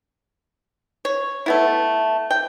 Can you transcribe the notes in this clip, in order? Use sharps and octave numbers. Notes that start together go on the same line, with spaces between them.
C#5
A3 B3 E4
G5